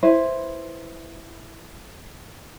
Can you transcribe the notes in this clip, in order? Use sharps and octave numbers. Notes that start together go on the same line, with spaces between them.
E4 B4 C5